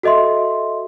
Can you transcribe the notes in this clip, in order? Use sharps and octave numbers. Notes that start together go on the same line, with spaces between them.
F#4 A4 D#5 E5 C6